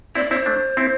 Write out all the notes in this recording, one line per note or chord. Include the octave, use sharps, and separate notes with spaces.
C4 E4 D5
C4 E4 C5
A3 D4
C4 E4